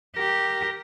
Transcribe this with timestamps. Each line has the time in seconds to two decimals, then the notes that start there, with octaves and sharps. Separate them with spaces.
0.16 G4 A#4